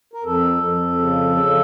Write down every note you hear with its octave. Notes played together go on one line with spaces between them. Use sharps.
A#4
F2 A4
F2
C#3
C#3